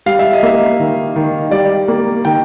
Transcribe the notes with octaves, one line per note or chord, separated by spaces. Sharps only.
G3 F5
E5
D#5
A#3 E5
D#3
D#3
G3 D5
A#3
D#3 G5